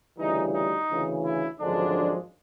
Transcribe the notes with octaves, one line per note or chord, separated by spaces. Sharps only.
D2 C#3 E3 G3 D#4
D#4
D2 C#3 E3
E4
G#1 F#2 D3 F3 G#3 D4